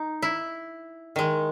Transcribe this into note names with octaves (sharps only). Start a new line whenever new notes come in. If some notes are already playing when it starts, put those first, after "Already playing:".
Already playing: D#4
E4
D#3 G#3